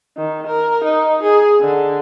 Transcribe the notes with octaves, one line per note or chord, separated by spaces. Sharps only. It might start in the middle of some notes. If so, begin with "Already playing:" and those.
D#3
A#4
D#4
G#4
D3